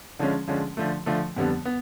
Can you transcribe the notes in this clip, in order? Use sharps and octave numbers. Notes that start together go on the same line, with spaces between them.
D3 F3 G#3 C#4
D3 F3 G#3 C#4
D3 F3 A3
D3 F3 A3
F2 D3 G3 B3
B3